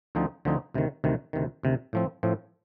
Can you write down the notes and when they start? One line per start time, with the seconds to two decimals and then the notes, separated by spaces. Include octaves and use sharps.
0.15 D2 D3 F3 C4 D#4
0.45 D2 D3 F3 C4 D#4
0.74 D2 C3 D#3
1.04 D2 C3 D#3
1.33 D2 C3 D#3
1.63 D2 C3 D#3
1.93 A2 F3 C4
2.23 A2 F3 C4